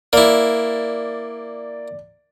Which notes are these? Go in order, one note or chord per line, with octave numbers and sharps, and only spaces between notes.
A#3 E4 D5